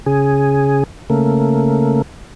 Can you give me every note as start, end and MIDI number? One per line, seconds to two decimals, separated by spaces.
0.06 0.84 49
0.06 0.84 68
1.10 2.02 49
1.10 2.02 57
1.10 2.02 58